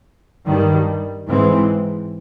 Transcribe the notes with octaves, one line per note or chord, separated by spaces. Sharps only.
G2 D#3 G3
G#2 E3 G#3 C4